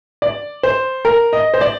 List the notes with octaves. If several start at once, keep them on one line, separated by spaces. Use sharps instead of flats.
D5
C5
A#4
D#5
C5
D5